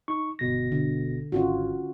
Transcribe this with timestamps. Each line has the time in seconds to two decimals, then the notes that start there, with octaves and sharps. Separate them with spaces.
0.08 D#4 C#6
0.39 G1 B2 A#6
0.72 D3
1.32 G#1 C#4 F4 F#4